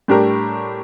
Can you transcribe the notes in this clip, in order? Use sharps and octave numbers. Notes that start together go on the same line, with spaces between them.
A2 G3 D4 G4 A#4